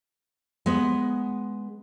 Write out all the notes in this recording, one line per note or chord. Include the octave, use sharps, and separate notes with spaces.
G#3 B3